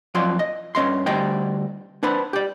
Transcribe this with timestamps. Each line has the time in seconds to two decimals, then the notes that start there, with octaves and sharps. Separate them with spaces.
0.15 F2 F#3 F4 D5 C6
0.39 D#5
0.75 G2 C#4 D#5 C6
1.06 D2 G3 C5 D#5 G5
2.03 D4 B4 C5 B5
2.33 G4 D5